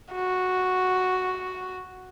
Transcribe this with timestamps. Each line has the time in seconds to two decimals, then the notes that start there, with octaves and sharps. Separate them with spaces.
0.12 F#4